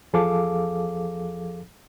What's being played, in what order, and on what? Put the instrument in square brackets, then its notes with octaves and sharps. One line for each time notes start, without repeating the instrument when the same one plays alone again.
[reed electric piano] E2 F3 G#4 A4 F5 D6